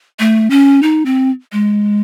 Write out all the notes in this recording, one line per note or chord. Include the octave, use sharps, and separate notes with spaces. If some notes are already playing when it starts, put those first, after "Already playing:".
A3
C#4
D#4
C4
G#3